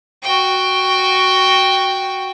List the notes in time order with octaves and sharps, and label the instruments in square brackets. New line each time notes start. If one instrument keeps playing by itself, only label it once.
[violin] F#4 G5